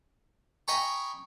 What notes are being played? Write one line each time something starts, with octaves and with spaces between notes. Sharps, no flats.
D#5 G5 G#5 A#5 B5 C#6